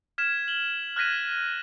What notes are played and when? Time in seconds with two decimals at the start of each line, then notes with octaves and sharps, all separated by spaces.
0.18 F6 G#6 B6 E7
0.48 F#7 G7
0.96 F6 F#6 G#6 A#6 B6 D#7